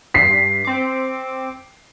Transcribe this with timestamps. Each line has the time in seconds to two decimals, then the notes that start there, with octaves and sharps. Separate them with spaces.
0.14 G2 B6 C7
0.65 C4 D6